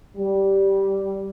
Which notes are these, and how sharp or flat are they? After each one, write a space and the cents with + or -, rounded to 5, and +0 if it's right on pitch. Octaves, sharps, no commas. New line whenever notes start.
G3 -10